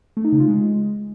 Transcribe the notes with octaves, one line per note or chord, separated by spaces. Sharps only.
A3
D#4
C#3
F4
G#3